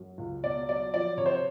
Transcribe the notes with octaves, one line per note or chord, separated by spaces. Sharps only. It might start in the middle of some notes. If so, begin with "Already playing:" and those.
Already playing: F#2
C#2
B2 D5
F#3 D5
F3 D5
C3 C#5
C5
C#5